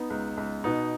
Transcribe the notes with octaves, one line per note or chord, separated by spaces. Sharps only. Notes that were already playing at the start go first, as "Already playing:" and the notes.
Already playing: B3 D#4
C#2
C#2
B2 B3 D#4